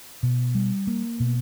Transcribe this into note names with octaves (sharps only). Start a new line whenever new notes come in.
B2
G3
A#3
B2